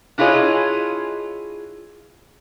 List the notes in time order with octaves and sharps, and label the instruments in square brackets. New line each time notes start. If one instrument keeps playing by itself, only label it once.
[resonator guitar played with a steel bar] D4 E4 F4 G#4 C#5 D#5